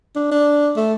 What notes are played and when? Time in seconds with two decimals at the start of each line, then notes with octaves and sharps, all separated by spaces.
0.16 D4
0.31 D4
0.76 A3